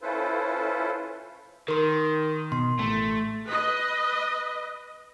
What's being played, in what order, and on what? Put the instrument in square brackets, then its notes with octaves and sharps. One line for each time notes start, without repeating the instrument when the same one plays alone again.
[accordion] C#4 E4 F4 A4 B4 C5
[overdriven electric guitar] D#3 [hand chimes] A#4 C6
[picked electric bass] B2 [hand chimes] C6
[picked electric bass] A1 [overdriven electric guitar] A3
[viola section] B4 D#5